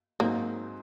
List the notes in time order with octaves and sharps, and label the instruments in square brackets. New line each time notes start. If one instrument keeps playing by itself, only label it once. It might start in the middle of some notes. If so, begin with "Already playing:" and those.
[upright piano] G#2 F#3 C4 D#4 [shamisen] A#3